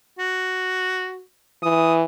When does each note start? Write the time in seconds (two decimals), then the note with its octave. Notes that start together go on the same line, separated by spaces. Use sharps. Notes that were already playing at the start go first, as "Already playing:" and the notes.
0.19 F#4
1.63 E3 D#6